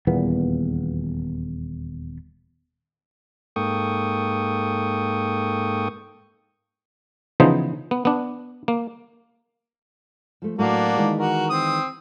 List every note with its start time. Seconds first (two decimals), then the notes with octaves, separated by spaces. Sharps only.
0.07 D#1 E2 A#2 B3
3.56 G#2 A#3 A4 G5 C#6 D#6
7.40 C#3 E3 F3 B3 D#4 C5
7.91 B3
8.05 B3 D4
8.68 A#3
10.42 F3 A3
10.59 A2 F#3 A3 A#3 D4 F#4
10.96 D#3 E3 G#3
11.19 F#4 A#4
11.50 C4 D#6